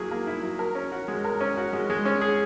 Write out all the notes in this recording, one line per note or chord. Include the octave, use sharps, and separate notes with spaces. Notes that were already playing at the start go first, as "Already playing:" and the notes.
Already playing: F#3 A#3 E4 G#4
A#3
E4
F#3
A#4
C#4
F#4
G#3
A#4
C#4
F#4
G#3
G#3
C#4
G#4